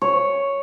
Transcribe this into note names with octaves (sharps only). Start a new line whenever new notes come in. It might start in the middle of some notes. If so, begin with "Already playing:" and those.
C#5